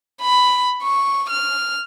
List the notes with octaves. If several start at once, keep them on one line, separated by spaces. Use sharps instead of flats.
B5
C#6
F6